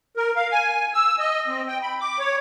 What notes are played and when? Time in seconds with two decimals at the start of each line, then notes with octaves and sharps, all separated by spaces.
0.17 A#4
0.36 F5
0.52 G#5
0.69 G#5
0.94 E6
1.19 D#5
1.47 C4
1.68 G5
1.82 B5
2.00 D6
2.19 C#5